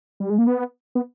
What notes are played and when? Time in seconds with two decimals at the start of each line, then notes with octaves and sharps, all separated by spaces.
0.20 G3
0.30 G#3
0.38 A#3
0.47 B3
0.95 B3